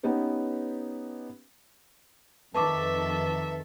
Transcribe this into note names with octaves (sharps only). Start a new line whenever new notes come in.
B3 C#4 D#4 G4 B4
F2 D#3 A4 B4 E5 A5 C#6 D6